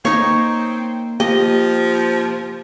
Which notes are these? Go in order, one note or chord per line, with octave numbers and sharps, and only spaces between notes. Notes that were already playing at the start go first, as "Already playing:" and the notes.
A#3 C4 D#4 C#5
F3 A#3 G4 D#5